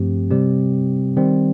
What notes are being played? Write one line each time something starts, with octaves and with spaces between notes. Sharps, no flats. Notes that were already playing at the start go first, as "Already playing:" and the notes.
Already playing: G2 F3 A3 C4 G4
C3 G3 C4 G4
D#3 G3 C4